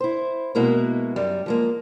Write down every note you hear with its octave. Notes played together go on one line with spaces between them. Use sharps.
E4 C5
B2 G#3 A#3 E4 F#4
F#2 G3
F3 G#3 A#3